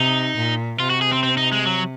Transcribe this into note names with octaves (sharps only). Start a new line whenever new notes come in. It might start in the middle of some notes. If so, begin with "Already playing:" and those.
Already playing: C3 D#4
A#2
C3 F4
F#4
G#4
C4
C4
D#4
G#3
F#3